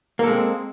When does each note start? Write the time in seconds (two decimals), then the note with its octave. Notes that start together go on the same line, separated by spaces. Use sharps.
0.19 A#3
0.23 A4
0.27 G#3
0.31 C4